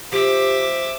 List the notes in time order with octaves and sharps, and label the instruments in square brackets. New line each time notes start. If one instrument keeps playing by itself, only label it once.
[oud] F3 [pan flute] G4 [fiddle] E5 D6